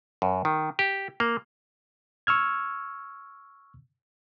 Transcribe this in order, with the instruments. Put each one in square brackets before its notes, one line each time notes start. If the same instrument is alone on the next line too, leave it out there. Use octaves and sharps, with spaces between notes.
[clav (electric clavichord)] F#2
D#3
G4
A#3
[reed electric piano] C#6 E6 F6 G#6